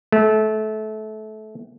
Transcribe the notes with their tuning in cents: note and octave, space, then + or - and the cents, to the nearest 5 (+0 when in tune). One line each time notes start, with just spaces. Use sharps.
A3 -25